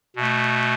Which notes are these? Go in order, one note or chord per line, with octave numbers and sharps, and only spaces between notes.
B2 A3